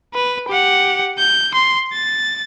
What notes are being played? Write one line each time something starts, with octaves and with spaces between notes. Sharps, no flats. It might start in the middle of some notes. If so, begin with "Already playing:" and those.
B4
G4 F#5
G6
C6
A6